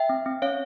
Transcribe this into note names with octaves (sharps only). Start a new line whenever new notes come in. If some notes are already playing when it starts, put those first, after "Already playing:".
Already playing: E5 G5
C4
C4
C#4 C#5 F5